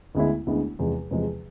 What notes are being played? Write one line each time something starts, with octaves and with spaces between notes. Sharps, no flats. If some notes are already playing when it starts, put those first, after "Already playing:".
D2 D3 G#3 B3 E4
D2 D3 G#3 B3 E4
E2 C3 F3 G#3
E2 C3 F3 G#3